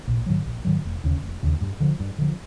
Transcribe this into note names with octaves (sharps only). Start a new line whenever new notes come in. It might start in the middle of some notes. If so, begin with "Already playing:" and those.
A#1
G#2 D#3 F#3
A#1
G#2 D#3 F#3
F1
D#2 C#3
F1
D#2 C#3
G2
D3 F3
G2
D3 F3